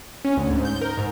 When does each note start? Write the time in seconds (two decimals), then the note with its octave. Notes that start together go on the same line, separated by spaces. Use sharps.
0.25 C#4
0.37 D2
0.51 G#2
0.65 G6
0.81 A#4
0.98 G#2